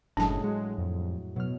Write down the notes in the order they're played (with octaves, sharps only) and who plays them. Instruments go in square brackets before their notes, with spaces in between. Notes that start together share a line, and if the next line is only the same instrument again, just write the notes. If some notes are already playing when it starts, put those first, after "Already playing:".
[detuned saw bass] F#1 [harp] A2 F#3 G#3 [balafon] D4 A5
[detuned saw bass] G#3 [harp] F#4
[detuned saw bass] F2
[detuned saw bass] B2 [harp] F#3 F6